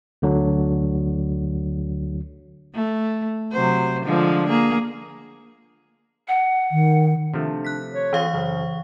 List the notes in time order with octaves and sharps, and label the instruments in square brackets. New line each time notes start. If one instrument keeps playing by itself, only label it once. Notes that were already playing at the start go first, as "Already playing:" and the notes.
[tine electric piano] D2 D3 F#3
[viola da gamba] A3
C3 F#3 C5
D3 F3 G#3
A#3 G#4
[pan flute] F#5
[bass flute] D#3
[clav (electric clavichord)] C3 F3 A3 [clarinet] D4
[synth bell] F#6 B6
[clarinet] C#5
[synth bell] E3 F5 C#6 [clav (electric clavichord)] C4 F4 G#4
[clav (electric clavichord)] F#2 C#3 [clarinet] C5